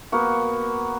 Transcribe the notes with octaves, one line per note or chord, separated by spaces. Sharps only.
A#3 B3 F#4